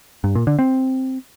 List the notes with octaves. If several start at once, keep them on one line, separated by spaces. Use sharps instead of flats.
G2
A#2
D3
C4